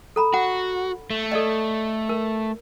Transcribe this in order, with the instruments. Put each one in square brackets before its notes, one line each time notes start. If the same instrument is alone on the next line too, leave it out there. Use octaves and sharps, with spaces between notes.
[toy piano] A4 A#5 B5
[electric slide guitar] F#4 [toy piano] F#5
[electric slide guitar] A3
[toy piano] A4 D5 D#5
A#4